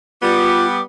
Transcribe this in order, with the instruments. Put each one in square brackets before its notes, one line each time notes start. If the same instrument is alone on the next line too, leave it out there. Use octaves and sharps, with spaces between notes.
[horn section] G3 B3 [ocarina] F4 [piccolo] D6